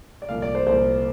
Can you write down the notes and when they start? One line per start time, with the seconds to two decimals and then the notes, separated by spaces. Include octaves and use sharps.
0.22 D5
0.29 C2 A#2 F3 F5
0.42 D5
0.55 C5
0.66 C2 A#2 F3 C5